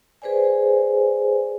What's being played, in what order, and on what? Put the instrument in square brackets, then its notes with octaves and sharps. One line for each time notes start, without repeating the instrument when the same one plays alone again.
[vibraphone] G#4 B4 C5 D5 G#5